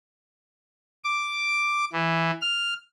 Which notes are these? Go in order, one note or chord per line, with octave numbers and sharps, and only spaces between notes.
D6
E3
F6